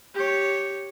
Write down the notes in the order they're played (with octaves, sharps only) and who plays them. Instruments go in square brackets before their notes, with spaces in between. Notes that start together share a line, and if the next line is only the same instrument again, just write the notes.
[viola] G4 C#5